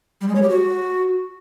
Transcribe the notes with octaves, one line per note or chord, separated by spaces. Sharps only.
G3
G#3
C#5
G4
F#4